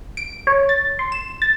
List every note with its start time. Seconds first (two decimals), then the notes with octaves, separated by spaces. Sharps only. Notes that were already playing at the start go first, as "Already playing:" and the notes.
0.17 D7
0.47 C#5
0.69 A6
0.99 C6
1.12 E7
1.42 A6